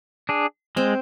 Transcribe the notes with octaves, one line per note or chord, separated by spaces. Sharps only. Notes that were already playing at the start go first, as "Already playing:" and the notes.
D4 G#4
G#3 C4